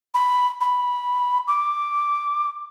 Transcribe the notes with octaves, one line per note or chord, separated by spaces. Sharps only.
B5
B5
D6